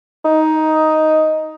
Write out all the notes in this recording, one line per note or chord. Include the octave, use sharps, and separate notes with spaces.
D#4